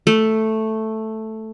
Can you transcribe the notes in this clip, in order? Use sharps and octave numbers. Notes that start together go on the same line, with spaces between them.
A3